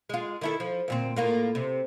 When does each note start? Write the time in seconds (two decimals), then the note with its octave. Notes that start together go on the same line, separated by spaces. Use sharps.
0.09 G#3 F4
0.41 D#3 E4 A4
0.60 F3
0.88 D2 A#2 C4
1.16 A2 A#3 F4
1.55 C3